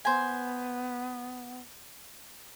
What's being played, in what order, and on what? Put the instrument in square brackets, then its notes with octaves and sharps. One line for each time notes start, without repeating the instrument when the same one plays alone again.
[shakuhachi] B3 [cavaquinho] C5 G#5